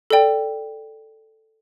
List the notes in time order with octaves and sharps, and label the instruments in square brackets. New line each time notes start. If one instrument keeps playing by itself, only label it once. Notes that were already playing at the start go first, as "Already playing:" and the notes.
[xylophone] A4 D5 G5